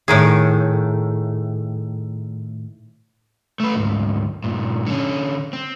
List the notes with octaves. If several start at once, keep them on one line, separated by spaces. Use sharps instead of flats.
A2 D#3 G#4
A3 B4
D2 G#2
G2 A#2
D3 C#4
C4